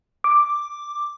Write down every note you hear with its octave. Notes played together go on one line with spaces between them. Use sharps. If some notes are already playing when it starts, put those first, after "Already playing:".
D6